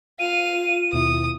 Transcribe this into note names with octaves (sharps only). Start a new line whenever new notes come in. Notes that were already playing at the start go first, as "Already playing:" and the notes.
F4 F5 D#7
D#2 B2 E4 D#6